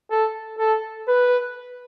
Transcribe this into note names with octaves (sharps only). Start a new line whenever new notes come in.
A4
A4
B4